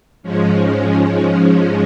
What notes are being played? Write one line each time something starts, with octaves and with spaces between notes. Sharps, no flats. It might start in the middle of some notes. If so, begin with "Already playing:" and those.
G#2 F3 G#3 C#4